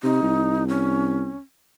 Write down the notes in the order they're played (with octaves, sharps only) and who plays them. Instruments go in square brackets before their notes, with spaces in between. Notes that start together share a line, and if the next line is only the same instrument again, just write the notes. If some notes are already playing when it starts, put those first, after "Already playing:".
[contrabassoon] C3 [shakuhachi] D#4
[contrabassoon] C2
[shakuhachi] C#4